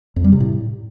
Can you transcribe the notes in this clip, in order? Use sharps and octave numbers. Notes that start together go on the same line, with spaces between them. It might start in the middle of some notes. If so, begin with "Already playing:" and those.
F2
G3
C3
A2